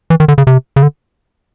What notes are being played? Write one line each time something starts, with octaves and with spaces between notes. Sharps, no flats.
E3
D#3
D3
C#3
C3
C#3
D3